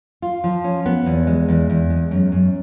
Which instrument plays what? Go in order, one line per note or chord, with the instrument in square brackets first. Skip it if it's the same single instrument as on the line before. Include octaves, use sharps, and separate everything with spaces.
[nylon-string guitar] F4
F3
C#4
B3
E2
G#3
E2
E2
G#3
F#2
F#2